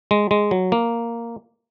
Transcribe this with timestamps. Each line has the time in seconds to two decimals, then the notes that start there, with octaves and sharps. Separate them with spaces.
0.11 G#3
0.31 G#3
0.51 F#3
0.72 A#3